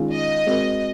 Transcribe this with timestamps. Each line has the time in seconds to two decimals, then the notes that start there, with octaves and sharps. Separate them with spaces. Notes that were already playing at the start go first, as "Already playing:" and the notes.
Already playing: D#3 G#3 C#4 F4
0.13 D#5
0.46 G#3 C4 F#4 A#4